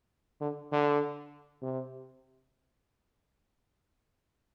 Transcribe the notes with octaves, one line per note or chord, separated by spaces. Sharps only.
D3
D3
C3